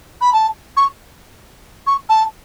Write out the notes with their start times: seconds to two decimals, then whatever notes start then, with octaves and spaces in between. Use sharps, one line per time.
0.21 B5
0.33 A5
0.76 C#6
1.86 C#6
2.09 A5